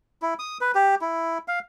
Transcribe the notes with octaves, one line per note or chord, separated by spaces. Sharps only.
E4
D#6
B4
G4
E4
F5